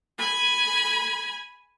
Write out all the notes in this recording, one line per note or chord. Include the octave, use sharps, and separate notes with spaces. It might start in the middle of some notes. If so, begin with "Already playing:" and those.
G#5 B5